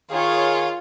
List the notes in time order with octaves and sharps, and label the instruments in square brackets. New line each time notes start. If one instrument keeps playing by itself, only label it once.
[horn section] D#3 G#4 C#5 [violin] F4